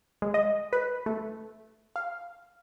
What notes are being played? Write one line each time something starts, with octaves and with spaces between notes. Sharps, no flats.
G#3
D#5
B4
A3
F5